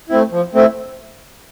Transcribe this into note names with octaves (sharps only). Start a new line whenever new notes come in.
A3 C4 E4
F3
A3 C4 E4